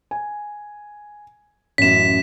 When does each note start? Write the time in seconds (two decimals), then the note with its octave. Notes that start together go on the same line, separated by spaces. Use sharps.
0.11 G#5
1.78 A1 F#2 B6 E7